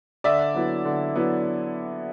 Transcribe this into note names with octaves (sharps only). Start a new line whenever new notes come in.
D3 D5 E5
F#3 B3 E4
D3
F#3 B3 E4